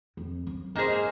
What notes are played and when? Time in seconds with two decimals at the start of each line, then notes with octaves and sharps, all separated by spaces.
0.17 F2
0.47 F#2
0.75 G#2 A#3 D#4 G#4 C5